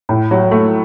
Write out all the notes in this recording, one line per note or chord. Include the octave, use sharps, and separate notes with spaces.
A2
F#3
A3